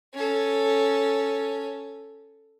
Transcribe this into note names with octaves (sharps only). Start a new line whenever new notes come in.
C#4 A4